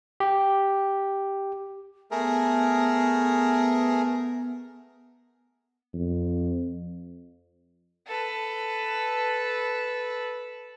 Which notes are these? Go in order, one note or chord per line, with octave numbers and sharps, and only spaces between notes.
G4
A3 B3 G#4 A#4
F2
A4 B4